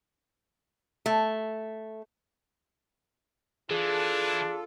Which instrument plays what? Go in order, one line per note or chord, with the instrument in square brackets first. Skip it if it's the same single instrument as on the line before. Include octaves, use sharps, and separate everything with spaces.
[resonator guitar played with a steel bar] A3
[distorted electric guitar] E3 [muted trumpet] D4 [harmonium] F4 A4 [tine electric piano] G#4